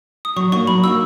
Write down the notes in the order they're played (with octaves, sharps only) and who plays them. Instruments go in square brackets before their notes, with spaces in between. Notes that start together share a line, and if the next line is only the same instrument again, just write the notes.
[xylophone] D#6
[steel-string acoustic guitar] F#3 [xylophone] C#6
[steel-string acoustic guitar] A#3 D#4 F#4 [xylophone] C#6
[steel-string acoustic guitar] F#3 [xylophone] B5
[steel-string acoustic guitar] A#3 D#4 F#4 [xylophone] E6